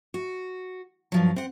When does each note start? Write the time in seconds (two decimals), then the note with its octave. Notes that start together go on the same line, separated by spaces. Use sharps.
0.14 F#4
1.12 G2 F3 F#3
1.36 C4 F#5